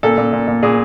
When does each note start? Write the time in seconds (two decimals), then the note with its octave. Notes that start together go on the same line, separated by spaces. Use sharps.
0.03 A#2 A4
0.18 A#2
0.33 A#2
0.48 A#2
0.63 A#2 G#4